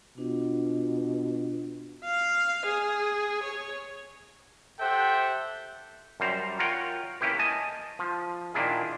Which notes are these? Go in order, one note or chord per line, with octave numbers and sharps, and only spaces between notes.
B2 D4 F4
F5
G#4
C#5
G4 A4 C5 E5 F#5 G5
F#2 G3 C5 A#5
F4 A#4 C#5 F#5 G5
A#3 C#4 E4 G4 B4
D#5 G#5 A5
F3
A#2 D#3 A#3 D4 E4 G#4